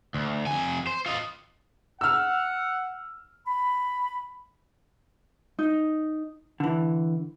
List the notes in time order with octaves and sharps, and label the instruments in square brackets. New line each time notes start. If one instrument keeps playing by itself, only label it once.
[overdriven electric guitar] D2
F2 G#5
C5
F4 D#5
[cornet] F#5 [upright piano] E6 F6
[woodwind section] B5
[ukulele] D#4
[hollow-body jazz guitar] D3 E3